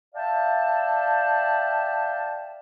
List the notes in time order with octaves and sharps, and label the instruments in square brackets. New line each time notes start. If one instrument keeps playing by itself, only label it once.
[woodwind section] D5 E5 F5 G5 A5